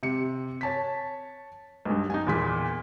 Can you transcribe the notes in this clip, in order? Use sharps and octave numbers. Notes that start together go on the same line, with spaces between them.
C3 C#7
C#5 A5 B6
B1 G2
D#4 G#5
E2 A#2 B6